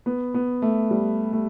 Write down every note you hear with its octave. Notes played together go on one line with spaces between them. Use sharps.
B3
B3
A3
G3
A3